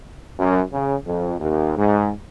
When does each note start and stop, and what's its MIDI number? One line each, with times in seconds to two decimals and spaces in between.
0.38 0.59 42
0.73 0.95 49
1.04 1.34 41
1.39 1.74 39
1.76 2.09 44